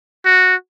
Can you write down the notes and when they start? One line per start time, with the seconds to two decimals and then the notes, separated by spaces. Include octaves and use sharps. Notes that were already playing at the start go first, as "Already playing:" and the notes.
0.25 F#4